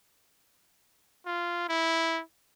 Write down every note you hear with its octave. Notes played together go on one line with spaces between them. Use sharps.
F4
E4